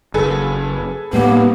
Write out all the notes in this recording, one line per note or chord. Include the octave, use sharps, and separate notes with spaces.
F#1 G#4 A4 B4
A2 G3 A#3 B3